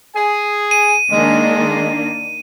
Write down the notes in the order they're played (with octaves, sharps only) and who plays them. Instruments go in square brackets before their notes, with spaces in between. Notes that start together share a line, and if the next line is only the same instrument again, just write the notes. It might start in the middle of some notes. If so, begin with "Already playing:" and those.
[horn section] G#4 G#5
[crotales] D#7
[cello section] D#3 A#3 D4 [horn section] G#3